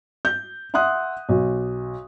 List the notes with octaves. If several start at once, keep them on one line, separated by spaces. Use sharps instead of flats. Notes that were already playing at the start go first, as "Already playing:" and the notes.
G6
E5 F#5 C6 D#6 F#6
B1